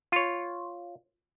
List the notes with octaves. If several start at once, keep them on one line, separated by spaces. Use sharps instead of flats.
F4 C#5